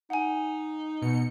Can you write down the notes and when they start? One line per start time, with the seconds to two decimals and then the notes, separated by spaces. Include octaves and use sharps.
0.10 D#4 F#5 G#5
1.02 B2 C#7